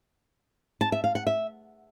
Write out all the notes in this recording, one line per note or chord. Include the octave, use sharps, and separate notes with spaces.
A5
E5
F5
F#5
E5